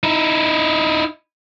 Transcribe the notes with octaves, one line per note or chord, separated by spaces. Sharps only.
D#4 E4